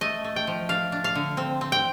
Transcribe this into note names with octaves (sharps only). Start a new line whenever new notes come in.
A3 D#5
A3
G5
F3
D4 F5
D4
F5
D3
C4
C4
G5